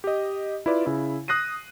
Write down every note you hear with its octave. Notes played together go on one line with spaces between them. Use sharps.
G4 D#5
E4 F4 B4 D5
C#3 E4
D#6 F#6 A#6 C7 D#7